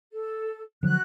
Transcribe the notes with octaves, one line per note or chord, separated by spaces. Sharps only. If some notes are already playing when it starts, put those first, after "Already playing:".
A4
D3 F3 F#3 F#4 F#6